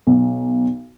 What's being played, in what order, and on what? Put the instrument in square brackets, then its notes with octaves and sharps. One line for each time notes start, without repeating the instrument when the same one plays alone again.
[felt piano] B1